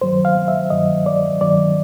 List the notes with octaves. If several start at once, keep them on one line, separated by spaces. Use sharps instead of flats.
G2 D#3 F#3 C5
F5
E5
G2 D#3 F#3 D#5
D5
G2 D#3 F#3 D5